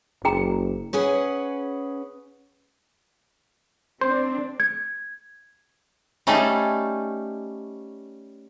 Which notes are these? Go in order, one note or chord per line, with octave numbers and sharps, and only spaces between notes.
F#1 G#4 G5 A#5
C#4 G#4 B4 F#5
C4 D4 C5
G#6
G3 A3 C#4 D#4 G#4 A4